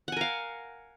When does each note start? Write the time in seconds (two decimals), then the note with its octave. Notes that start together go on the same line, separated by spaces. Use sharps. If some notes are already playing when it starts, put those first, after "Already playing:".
0.08 F#5
0.12 G#5
0.17 A#4
0.21 F5